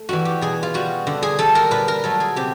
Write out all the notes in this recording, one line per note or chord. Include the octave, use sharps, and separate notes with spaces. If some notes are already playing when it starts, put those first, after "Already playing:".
Already playing: A3
E3 G3 F#4
G4
B2 G#4
F4
G3 F#4
D3
G#4
G3 A4
A#4
A#2 B4
A#4
F#3 A3 A4
G#4
C3 G4